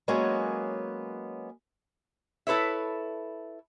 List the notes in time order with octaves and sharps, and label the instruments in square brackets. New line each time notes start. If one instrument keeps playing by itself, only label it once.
[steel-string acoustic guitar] F#3 G#3 A#3 B3 C#4
[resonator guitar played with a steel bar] E4 A4 B4 C#5 E5